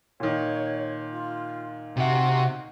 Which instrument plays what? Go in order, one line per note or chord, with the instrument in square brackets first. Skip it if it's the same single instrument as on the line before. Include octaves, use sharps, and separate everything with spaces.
[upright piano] A#2 D#3 [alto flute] C#5
[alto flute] F4
[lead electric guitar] C3 E5 [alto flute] F#4